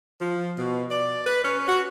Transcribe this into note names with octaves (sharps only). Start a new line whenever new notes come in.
F3
B2
D5
B4
C#4
F#4